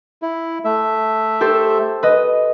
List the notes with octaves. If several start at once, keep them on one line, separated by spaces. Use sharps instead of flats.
E4
A3 E5
G4 A4 C5
B4 D#5